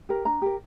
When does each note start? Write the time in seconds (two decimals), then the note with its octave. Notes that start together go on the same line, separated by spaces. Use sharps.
0.09 G4 A#4
0.25 D4 A#5
0.42 G4 A#4